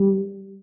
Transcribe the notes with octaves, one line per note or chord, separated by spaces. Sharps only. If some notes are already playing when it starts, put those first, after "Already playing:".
Already playing: G3